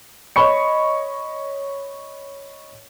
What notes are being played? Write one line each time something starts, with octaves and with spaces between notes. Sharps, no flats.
C#5 D#5 B5 C#6 C#7